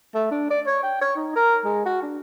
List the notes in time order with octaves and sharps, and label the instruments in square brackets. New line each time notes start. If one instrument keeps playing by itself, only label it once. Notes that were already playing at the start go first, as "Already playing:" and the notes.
[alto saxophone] A3
D4
D5
C#5
G5
C#5
D#4
A#4
G#3
F#4
D4